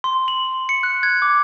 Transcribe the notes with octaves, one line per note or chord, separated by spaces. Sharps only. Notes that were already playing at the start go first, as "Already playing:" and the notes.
C6
F#7
C#7
F#6
G#6
D6